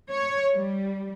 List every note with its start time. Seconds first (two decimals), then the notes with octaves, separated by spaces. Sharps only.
0.10 C#5
0.55 G3